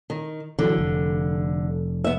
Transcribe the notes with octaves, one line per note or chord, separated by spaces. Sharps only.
D#3
D3 E3 F#3
F1
B3 E5